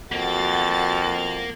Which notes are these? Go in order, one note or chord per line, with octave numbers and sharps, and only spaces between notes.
F2 A#3 F#4 A6